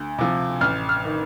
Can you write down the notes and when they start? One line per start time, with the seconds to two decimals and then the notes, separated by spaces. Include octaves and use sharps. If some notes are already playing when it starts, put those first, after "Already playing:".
Already playing: D2
0.18 C3 F3
0.61 A1 F6
0.89 F6
1.05 D#3